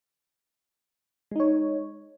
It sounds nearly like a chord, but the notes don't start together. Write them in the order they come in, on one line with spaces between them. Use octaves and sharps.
G#3 D#4 C#5